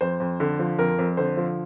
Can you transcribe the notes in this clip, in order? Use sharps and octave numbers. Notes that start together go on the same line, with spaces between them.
F2 C5
F2
D3
F3
F2 A#4
F2
D3 C5
F3